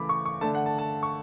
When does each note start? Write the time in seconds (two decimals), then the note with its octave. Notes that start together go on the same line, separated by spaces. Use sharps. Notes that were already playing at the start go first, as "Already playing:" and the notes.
Already playing: C#3 E3 A3 B5 D6
0.09 C#6
0.26 C#6
0.41 D3 A3 D4 A5
0.55 F#5
0.66 A5
0.78 A5
1.03 C#6